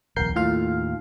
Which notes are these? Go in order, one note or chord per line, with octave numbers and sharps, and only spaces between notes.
D1 B1 E2 A#4 G6 C7
D#2 A2 F4 F5